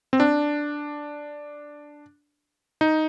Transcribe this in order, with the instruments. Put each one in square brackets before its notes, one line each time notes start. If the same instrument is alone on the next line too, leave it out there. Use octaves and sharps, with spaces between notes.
[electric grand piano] C4
D4
D#4